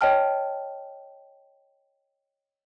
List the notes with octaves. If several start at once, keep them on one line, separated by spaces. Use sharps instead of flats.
C#5 D#5 G5 A5 F6